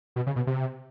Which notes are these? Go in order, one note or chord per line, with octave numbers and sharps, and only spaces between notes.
B2
C#3
B2
C3